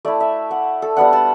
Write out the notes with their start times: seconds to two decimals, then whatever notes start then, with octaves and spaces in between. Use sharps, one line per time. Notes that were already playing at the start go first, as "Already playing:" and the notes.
0.05 A3 E4 D5
0.20 E5
0.51 F#5
0.82 A4
0.97 G3 B3 D4 F#5
1.13 A5